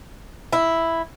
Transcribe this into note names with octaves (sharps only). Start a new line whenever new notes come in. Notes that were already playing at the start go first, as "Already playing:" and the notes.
E4